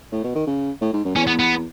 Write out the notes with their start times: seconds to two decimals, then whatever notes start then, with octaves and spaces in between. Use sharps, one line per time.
0.12 A2
0.24 B2
0.35 D#3
0.47 C#3
0.81 A2
0.93 G#2
1.05 F#2
1.16 E2 C#4
1.27 B3
1.39 B3